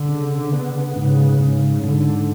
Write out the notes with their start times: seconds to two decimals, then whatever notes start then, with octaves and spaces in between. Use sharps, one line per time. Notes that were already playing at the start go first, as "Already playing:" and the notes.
Already playing: D3
0.08 C#3
0.52 B3
0.96 G#2 C#3
1.40 G#2
1.84 G#2 D3